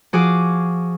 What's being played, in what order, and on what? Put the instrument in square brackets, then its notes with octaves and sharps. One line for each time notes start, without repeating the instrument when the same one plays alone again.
[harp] F3 F#4 G#4 G#5 D6